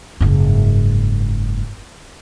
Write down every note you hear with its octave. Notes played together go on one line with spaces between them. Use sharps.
F#1 G#2